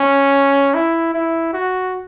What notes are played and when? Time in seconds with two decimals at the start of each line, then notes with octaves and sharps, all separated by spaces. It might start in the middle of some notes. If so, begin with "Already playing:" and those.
Already playing: C#4
0.74 E4
1.14 E4
1.53 F#4